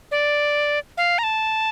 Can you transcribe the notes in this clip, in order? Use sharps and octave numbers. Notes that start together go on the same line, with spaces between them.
D5
F5
A#5
A5